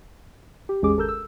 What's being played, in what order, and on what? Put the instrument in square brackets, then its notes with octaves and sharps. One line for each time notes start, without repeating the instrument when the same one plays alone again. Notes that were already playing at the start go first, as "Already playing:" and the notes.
[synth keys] G4
A1 E2 G#3 C#4 G#4 D6
G#1 A4 A#4 E6 G6
E6